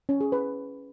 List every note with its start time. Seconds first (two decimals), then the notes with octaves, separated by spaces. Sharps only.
0.09 C#4
0.21 G#4
0.32 B4